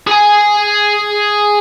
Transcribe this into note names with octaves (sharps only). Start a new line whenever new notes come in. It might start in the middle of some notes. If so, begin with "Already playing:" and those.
G#4 G#5